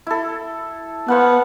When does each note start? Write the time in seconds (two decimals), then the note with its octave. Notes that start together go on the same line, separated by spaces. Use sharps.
0.07 E4 A4
1.08 B3 C5 F5 F#5